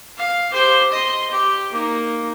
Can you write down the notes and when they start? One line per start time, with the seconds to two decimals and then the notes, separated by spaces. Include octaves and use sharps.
0.17 F5
0.51 G4 C5
0.92 D#5 C6
1.30 G4
1.72 A#3 D#4